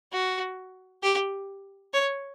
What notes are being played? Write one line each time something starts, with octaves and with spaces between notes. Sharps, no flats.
F#4
G4
C#5